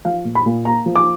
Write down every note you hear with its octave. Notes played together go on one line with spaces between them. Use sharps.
F3 F5
A#2
B5
A#2
A#3 A#5
F3
D6